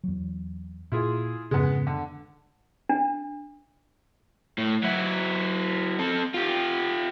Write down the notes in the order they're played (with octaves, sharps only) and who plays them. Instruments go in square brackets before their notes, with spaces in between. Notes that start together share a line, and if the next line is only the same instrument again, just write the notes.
[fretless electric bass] E2 F#3
[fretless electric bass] A#2 [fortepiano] E4 F4 G#4
[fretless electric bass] F2 G#2 C#3 [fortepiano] G#3 B3
[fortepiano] D3
[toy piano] D4
[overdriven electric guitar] A2
F#3 E4
C4 A4
F4 G4